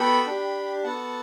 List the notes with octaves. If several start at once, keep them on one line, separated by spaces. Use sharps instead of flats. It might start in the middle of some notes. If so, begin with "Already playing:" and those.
Already playing: B3 F#4 A4 G5 B5
D4 G4
B3 F#4 A4 F#5 A5